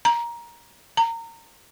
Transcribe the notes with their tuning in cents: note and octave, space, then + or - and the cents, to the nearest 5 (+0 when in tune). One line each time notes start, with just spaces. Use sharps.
A#5 +15
A#5 -25